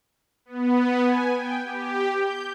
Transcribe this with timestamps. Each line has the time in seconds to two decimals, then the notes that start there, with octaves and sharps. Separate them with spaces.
0.45 B3
1.01 G#5
1.32 G5
1.64 G4
2.20 G6